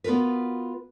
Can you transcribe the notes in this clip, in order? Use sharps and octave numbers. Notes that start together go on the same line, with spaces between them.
B3 F4 F#4 A#4 B4